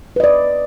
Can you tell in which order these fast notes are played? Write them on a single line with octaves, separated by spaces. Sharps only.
B4 D#5 D5